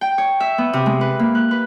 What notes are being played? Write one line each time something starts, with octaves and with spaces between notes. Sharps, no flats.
G5
C#5
E5
B3
C3
G#3
B4
A#3
F#6
B4